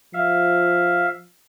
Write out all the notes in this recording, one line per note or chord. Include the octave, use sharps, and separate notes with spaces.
F3 E5 F5